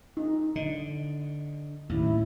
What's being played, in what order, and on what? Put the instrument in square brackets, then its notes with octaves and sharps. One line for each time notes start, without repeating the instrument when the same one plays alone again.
[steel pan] D#4
[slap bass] D3 [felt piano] D#5
[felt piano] A1 [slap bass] D#2 [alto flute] E4